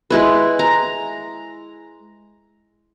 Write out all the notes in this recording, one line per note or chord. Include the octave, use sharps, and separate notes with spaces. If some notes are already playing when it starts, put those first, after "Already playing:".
G#3 E4 B4
A#5